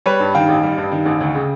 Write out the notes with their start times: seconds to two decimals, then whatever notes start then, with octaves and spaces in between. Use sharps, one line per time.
0.06 G3 B4 C#5
0.20 G2
0.34 D#3 F5 G5
0.48 A1
0.63 G3
0.78 G2
0.92 D#3
1.06 A1
1.21 D2
1.35 C#3